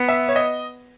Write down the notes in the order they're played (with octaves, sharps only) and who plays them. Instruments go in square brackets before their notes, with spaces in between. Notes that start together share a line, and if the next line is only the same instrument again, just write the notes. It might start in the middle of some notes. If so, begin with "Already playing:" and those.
Already playing: [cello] B3
[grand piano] E5
C#5
D#5